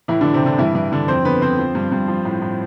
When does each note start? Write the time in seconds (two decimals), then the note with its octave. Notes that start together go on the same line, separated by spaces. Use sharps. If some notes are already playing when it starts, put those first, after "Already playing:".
0.08 A2 E3 E4
0.21 D3 D4
0.25 E3
0.34 C3 C4
0.42 D3 E3 D4
0.58 G2 E3 E4
0.75 G2 E3 E4
0.92 G2 D3 D4
1.08 F2 C4 C5
1.25 D3 B3 B4
1.42 D3 C4 C5
1.58 F3
1.75 G2
1.92 G2
2.08 F3
2.25 A2
2.42 A2